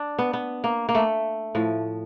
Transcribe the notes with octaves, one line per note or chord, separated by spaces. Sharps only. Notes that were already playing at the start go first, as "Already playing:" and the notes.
Already playing: D4
B3
B3
A#3
A#3
A3
A2 F3